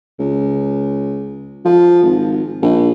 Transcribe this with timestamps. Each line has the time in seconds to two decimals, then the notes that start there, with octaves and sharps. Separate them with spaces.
0.19 C#2
1.65 F3
2.03 G#1
2.62 A#1